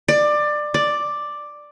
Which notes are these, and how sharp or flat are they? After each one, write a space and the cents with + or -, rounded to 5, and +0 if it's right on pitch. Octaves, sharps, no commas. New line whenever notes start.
D5 +20
D5 +5